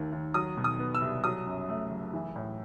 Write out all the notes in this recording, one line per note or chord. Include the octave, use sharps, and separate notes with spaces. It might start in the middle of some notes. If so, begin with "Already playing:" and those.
Already playing: D#2 D#3 A3
D#2
F#3 D#6
B2
D#6
B3
E6
C2
F#3 D#6
F#2
A3
F#1
E3
A2